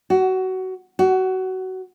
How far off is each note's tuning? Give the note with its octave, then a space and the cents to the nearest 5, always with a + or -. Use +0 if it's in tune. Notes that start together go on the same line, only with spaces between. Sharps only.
F#4 +20
F#4 +20